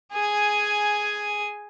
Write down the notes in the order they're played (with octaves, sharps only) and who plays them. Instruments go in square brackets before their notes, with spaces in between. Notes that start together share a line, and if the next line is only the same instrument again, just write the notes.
[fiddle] G#4 G#5